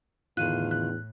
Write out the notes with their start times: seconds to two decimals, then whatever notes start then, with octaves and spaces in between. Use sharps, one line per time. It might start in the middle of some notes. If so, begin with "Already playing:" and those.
0.37 E2 A2 D3 D#3 F4 F#6 D#7
0.71 F#6